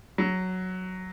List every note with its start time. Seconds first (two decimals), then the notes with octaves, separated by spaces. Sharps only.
0.18 F#3